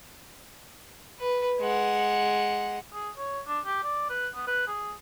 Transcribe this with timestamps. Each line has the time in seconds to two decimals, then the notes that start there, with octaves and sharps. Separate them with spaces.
1.19 B4
1.61 G#3 F#5
2.93 G#4
3.17 C#5
3.47 D4
3.65 G4
3.84 D5
4.10 B4
4.35 B3
4.47 B4
4.68 G#4